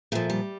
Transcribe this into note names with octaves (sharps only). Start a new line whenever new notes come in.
A#2 F3 A3
G3